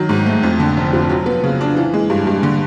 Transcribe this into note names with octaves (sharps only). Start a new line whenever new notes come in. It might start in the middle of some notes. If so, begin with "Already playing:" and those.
Already playing: D#3 F#3
G#2
A3
F2
D3
F1
F3
F#3
B3
C#3
D4
E3
G#3
G2
G2
D3